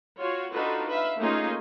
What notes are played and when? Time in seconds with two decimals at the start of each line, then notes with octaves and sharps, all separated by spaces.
0.18 F4 F#4 C#5
0.53 D4 D#4 F4 F#4 A4 B4
0.88 B4 E5 F5
1.18 A3 A#3 C#4 D#4 F4 G#4